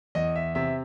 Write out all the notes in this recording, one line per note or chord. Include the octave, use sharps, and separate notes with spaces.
E2 D#5
E5
C3 E5